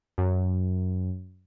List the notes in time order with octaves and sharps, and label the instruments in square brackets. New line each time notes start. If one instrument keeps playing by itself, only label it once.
[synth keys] F#2